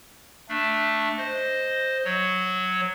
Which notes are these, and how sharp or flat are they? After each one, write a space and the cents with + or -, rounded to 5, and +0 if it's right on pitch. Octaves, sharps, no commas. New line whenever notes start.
A3 +0 D4 +0
C5 +0 D#5 +0
F#3 +0 C#5 +0